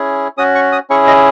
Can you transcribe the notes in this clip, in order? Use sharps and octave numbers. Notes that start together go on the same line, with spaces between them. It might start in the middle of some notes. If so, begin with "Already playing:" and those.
Already playing: C#4 E4 G#4
C#4 F#4 D#6
C#6
D#6
C#4 E4 G#4 C#6
D#5